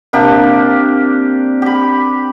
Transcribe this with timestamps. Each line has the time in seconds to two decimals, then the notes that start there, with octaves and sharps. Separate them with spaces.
0.13 C3 A#3 D4 G4
1.62 G4 B5